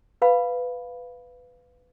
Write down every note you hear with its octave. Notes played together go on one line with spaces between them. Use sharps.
B4 F5 B5